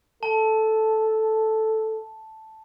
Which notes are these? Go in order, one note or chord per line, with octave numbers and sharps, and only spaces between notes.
A4 A5